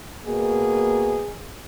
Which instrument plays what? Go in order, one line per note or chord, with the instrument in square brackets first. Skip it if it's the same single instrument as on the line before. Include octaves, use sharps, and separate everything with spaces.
[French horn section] B2 A#3 G#4